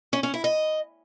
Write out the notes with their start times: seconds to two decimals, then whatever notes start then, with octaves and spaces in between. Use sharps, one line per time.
0.13 C#4
0.23 C#4
0.34 E4
0.44 D#5